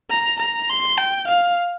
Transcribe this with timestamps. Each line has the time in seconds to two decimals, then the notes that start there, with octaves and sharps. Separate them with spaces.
0.10 A#5
0.40 A#5
0.69 C6
0.98 G5
1.27 F5